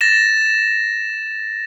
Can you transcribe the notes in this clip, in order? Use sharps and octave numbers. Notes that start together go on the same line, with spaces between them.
A6 A#6 E7